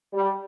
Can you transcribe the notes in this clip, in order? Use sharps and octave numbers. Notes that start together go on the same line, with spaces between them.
G3